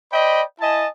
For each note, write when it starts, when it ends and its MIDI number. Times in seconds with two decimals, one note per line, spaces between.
0.13 0.43 72
0.13 0.43 74
0.13 0.43 75
0.13 0.43 79
0.13 0.43 83
0.61 0.87 64
0.61 0.87 75
0.61 0.87 80
0.61 0.87 81